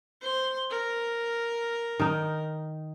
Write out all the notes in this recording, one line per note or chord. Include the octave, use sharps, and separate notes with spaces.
C5 C6
A#4
D#3 D#4